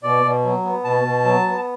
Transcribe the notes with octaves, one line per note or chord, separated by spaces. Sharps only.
B2 D5
B2
F#3
B3
B2 A5
B2
F#3
B3